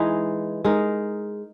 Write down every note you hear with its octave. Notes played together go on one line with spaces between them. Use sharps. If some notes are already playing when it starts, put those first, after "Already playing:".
Already playing: E3 G#3 D#4
G#3 D#4 A#4